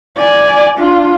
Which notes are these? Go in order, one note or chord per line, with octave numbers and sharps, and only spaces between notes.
D5 G#5
D4 F4